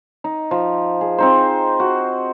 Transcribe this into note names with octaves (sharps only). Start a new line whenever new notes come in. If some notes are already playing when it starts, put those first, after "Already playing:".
D#4
F3
G#4
C4 D#4 C5
F#4